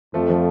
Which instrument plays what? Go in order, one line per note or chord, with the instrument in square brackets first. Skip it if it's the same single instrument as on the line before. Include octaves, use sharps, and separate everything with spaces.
[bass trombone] F2 [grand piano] F3 A3
[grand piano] F3